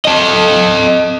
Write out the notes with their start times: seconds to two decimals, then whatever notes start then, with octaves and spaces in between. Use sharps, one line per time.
0.05 A4 D#5